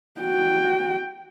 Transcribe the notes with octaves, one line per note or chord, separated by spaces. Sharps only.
F#4 G5